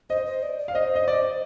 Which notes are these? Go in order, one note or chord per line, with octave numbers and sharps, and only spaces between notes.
C5 D#5
C5
D5
D5
F5
C5 D#5
D#5
D5